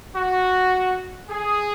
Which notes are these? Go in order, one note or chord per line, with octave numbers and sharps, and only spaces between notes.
F#4
G#4